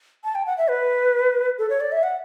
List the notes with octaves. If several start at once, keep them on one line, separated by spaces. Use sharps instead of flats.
A5
G5
F#5
E5
B4
A4
C#5
D5
E5
F#5